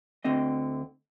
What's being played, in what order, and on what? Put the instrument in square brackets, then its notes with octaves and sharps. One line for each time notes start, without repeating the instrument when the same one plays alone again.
[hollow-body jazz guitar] D2 D3 C4 D#5